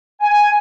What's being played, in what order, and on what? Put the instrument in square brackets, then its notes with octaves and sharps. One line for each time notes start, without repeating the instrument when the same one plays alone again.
[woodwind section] G#5